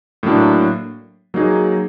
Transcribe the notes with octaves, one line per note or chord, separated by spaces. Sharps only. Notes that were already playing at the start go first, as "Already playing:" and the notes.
A2 F#3 A#3 D4
F#3 A#3 D#4 G#4